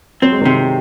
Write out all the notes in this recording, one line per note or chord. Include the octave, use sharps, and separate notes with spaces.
F#3 C4
G#3
C3 D#3 F#3